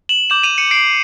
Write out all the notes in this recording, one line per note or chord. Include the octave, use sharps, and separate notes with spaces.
E7 F#7
D6 G6 E7 F#7
D#7 F7
C#7 D#7
C7 D7